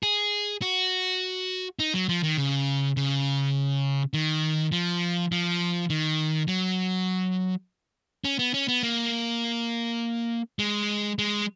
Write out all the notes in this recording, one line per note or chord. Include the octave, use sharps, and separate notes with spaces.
G#4
F#4
D#4
F#3
F3
D#3
C#3
C#3
D#3
F3
F3
D#3
F#3
C#4
B3
C#4
B3
A#3
G#3
G#3